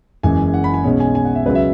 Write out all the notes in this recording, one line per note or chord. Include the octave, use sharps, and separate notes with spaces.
F#1 F#2 E3 G#3 G#5
F#5
B5
G#5
B1 B2 G#3 C#4
G#5
G#5
F#5
E5
C#2 C#3 F#3 B4
E5